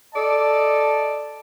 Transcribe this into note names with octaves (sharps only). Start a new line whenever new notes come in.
A4 D5 D#5 A5